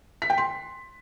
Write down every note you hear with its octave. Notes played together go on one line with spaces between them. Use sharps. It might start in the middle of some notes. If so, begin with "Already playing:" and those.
B6
G5
C6